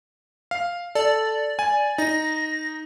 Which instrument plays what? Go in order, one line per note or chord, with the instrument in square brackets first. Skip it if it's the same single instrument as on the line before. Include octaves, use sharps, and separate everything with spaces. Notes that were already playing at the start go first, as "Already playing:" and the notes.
[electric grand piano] F5
[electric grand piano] A4 [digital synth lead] D5
[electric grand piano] G#5
[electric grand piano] D#4 [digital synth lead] A#6